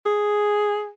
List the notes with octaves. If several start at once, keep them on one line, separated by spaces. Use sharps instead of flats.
G#4